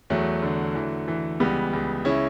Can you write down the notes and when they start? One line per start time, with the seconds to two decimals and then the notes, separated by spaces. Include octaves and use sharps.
0.10 E2 F#3 A3
0.42 D3
0.75 E3
1.08 E3
1.40 C#2 G3 B3
1.73 C#2
2.05 C#3 C#4 E4